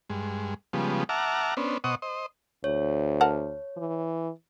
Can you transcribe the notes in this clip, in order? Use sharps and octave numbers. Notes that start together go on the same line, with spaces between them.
G2 G#3
C#3 F3 G3 G#3 B3
E5 F#5 A5 A#5 D6 F6
B3 C#4 D4 C5
B2 C5 D#5 F#5 C#6 D#6
C5 D#5
D2 C#5
A#4 F#5 A5
E3